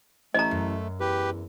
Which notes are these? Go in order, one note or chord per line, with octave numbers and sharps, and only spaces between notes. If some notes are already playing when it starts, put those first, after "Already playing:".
A1 A3 D#5 A#5
F#2
E2 G4 B4